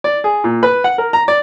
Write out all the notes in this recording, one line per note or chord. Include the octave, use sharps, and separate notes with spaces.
D5
G#4
A#2
B4
F#5
A#4
A#5
D5